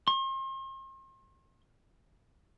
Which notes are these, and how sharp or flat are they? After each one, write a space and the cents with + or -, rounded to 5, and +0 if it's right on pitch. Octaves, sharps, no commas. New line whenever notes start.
C6 +40